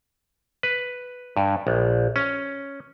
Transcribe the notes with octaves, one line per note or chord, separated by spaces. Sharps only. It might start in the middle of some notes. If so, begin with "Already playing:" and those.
B4
G2
A#1
C#4